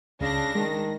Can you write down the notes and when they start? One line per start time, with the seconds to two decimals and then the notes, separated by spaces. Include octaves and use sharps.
0.21 C#2 C#3 D4 A#6
0.55 D#3 G#3